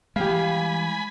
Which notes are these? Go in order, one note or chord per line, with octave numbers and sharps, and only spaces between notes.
E3 G3 G#3 G4 D#5 F5 G#5 B5